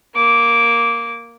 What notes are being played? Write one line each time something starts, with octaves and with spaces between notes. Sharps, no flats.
A#3 D6